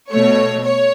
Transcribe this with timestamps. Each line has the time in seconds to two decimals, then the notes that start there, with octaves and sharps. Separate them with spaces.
0.11 B2 A3 C#5
0.64 C#5